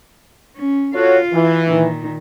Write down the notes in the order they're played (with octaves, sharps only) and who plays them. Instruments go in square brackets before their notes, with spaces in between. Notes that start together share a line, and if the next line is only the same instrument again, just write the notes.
[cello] C#4
[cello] F4 F5 [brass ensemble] F#4 A4 C#5
[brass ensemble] E3
[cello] A#2 D#3